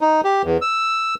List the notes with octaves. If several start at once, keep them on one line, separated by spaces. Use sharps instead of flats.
D#4
G4
E2
E6